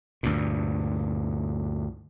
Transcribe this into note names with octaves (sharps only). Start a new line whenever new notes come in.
D2 G2 A#2